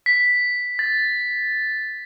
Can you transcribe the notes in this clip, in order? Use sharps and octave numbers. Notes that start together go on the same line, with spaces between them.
B6
A6